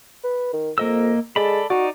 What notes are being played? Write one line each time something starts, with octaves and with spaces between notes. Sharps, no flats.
B4
D#3
F2 A#3 D#5 E6
G#3 A4 D5 B5
D#4 F#4 D5